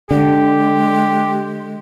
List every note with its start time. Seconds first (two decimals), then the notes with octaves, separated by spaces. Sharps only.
0.11 D3 G#3 G4